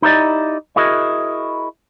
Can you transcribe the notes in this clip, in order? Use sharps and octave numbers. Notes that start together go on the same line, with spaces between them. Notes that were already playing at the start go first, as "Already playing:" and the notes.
D#4 E4 G4 A#4 D5 D#5
E4 F#4 G#4 A#4 D#5